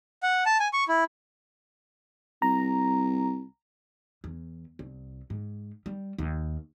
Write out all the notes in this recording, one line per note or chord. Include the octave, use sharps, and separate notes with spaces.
F#5
A5
G#5
C#6
E4
C2 A#5
E2
C2
G#2
G3
D#2